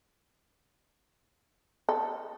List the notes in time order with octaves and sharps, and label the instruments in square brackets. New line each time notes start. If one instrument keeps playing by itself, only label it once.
[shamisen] A4